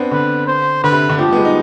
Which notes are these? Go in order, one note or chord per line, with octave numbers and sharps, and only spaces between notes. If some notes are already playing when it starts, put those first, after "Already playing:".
Already playing: B3 C4 D4
D3 B4
C5
D3 B4
C3
D3
F3 G4
G3
B3
G#3
D#4